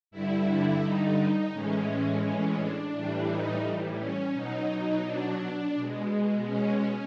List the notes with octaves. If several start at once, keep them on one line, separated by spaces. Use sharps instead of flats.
G2 D3 G3 E4
D#4
A2 E3 G#3 C#4
C#4
D4
A2 E3 G3
D#4
C#4
B2 F#3 D#4
D4
B2 G#3
C#4